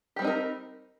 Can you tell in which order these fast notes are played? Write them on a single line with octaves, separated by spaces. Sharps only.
G4 G3 C4 D#4 A#4